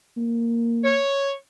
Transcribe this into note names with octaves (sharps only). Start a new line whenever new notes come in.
A#3
C#5